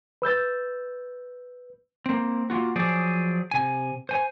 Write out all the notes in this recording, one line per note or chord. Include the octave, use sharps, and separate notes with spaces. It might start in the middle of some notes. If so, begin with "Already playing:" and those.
B4 E6 G6 A6
A#3 C4
A#3 F4 F#4
F3 F#3 G#4 C5 D5
C3 G#5
C5 G#5